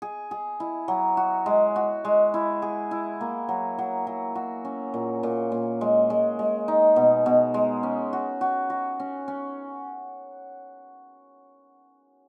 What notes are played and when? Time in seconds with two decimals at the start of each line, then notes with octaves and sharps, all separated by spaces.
0.02 G#4
0.31 G#4
0.60 E4
0.88 F#3
1.17 F#4
1.46 G#3
1.76 F#4
2.05 G#3
2.34 E4
2.62 G#4
2.91 E4
3.21 A#3
3.49 F#3
3.79 F#3
4.07 F#3
4.35 F#4
4.65 C#4
4.94 A#2
5.23 A#2
5.52 A#2
5.81 G#3
6.10 G#3
6.39 G#3
6.68 D#4
6.96 B2
7.26 B2
7.54 G#3
7.83 C#4
8.13 F#4
8.41 F#4
8.70 F#4
9.00 C#4
9.28 C#4